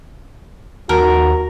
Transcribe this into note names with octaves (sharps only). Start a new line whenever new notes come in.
D#2 F#4 A#4